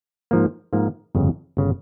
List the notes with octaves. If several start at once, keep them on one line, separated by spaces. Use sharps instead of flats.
G#2 F3 A#3
G#2 F3 A#3
G1 F2 C#3
G1 C#3